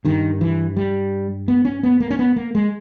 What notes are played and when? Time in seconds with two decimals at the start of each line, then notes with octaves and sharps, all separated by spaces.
0.05 G2 D#3
0.41 E3
0.77 G3
1.48 B3
1.65 C#4
1.83 B3
2.00 A#3
2.11 C#4
2.19 B3
2.36 A#3
2.55 G#3